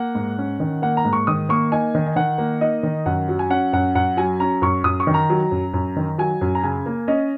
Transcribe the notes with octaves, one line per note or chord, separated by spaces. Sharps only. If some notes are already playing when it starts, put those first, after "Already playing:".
Already playing: A#3 F#5
G#2
C#4
D#3
A#3 F#5
A#5
G#2
C#6
D#3 D#6
A#3 C#6
D#4 G#5
D#3
D#5
D#3 F#5
A#3
D#4 D#5
D#3
F#2 F#5
F#3
G#5
C#4 F#5
F#2 F#5
F#2 F#5
F#3 G#5
C#4 A#5
F#2 C#6
F#2 D#6
C#6
D#3
A#5
F#3
F#2
F#2
D#3
F#3 G#5
F#2
A#5
C#3 G#5
A#3
C#4 D#5